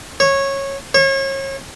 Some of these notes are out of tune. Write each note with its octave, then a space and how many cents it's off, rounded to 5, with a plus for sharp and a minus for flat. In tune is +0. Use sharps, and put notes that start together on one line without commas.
C#5 -15
C#5 -35